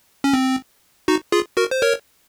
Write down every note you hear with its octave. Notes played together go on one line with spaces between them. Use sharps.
C#4
C4
D#4 F#4
F4 G#4
F#4 A#4
C5
A#4 C#5